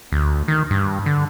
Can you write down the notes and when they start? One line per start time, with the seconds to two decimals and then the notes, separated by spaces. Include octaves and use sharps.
0.12 D2
0.48 D#3
0.71 G2
1.06 D3